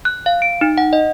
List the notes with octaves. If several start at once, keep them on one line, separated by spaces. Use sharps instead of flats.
F#6
F5
D7
D#4
F#5
D#5